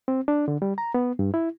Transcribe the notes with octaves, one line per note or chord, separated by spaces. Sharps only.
C4
D4
D3
G3
A#5
B3
G2
E4